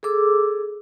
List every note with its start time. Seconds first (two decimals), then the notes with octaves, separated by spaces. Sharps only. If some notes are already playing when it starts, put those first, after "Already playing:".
0.03 G#4 A4 D6 E6